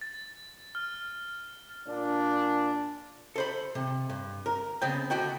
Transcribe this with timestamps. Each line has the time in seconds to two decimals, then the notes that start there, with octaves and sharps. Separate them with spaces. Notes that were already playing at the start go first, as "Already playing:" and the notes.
0.01 A6
0.75 F6
1.88 A#2 D4
3.36 A4 C5 B5
3.75 C3
4.10 G2
4.46 A#4
4.82 C#3 B3 C4 G5
5.10 D2 B2 F#4 G5